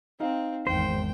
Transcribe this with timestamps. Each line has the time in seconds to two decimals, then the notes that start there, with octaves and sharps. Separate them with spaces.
0.20 C4 D#4 F5
0.67 G#1 E2 C5 G5